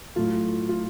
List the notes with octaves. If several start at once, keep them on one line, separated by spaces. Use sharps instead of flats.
A2 F#3 A3 F4
F4